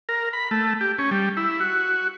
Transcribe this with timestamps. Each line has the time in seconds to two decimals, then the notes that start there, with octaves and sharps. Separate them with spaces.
0.09 A#4
0.33 B5
0.51 A3
0.81 G4
0.99 C#4
1.11 G3
1.37 E4
1.60 F#4